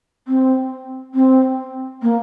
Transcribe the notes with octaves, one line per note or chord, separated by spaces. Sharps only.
C4
C4
A#3